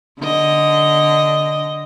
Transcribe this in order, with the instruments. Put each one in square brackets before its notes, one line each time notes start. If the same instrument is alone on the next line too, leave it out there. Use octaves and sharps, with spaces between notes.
[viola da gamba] D3 D#5